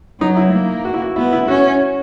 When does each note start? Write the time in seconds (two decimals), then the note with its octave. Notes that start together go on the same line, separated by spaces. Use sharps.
0.20 F#3 D#4
0.36 E4
0.53 A#3
0.85 F#4
0.94 E4
1.02 F#4
1.16 B3 E4
1.33 E4
1.48 C#4 F#4